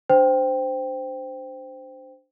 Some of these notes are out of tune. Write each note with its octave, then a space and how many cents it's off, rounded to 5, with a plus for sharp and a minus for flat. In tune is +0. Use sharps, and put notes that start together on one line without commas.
D4 +0 C5 -10 G5 +0